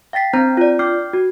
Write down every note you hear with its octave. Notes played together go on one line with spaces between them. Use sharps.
F5 G5 A6 B6 C7
C4 D4 C5 A#5 G6
F4 D5
D4 D6 F6 G6 C7
F#4